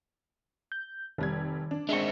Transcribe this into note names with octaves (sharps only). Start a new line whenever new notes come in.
G6
F1 D#3 G3 G#6
D4
G#3 C4 D4 E5 C#6 C#7